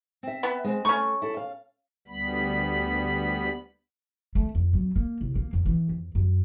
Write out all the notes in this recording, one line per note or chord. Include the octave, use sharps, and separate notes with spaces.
C4 E5
B3
G#3 C4
A3 C#4 C#6
E4 A4
F5
D2 G3 B3 B5
A3
F2
F#3
A#3
C2
A#3
F2
E3
F2
F#2